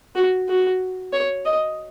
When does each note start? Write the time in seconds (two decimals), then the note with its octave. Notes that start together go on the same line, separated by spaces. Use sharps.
0.16 F#4
0.49 F#4
1.13 C#5
1.46 D#5